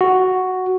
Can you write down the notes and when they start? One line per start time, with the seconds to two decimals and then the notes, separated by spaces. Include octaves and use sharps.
0.01 F#4